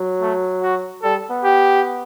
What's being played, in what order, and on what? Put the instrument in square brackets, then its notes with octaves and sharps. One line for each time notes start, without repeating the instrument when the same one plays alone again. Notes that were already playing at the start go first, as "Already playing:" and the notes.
Already playing: [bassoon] F#3
[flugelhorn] A3
F#4
[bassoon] G3 [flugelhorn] A4
[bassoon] B3
[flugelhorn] G4